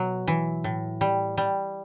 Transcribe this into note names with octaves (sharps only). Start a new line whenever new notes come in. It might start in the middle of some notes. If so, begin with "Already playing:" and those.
Already playing: B2 F#3
E3
A2
G3
G3